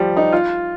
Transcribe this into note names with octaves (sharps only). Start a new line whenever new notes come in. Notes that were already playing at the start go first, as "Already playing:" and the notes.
Already playing: F3 G3
D#4
F4